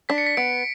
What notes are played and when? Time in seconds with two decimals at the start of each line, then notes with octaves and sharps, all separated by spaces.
0.09 D4 B6
0.18 C#7
0.26 B6
0.37 B3 D7